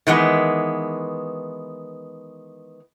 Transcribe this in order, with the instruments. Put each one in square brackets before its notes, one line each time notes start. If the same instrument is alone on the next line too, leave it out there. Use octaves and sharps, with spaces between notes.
[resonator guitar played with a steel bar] D#3 E3 G#3 B3